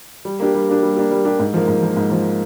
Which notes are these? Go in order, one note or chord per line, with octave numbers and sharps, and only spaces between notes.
G3
A#3 D4 G4
G3
A#3 D4 G4
G3
A#3 D4 G4
G3
A#3 D4 G4
G#2
F3 A#3
G#2
F3 A#3
G#2
F3 A#3